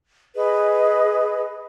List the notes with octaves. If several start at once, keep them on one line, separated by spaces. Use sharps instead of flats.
G#4 B4 D#5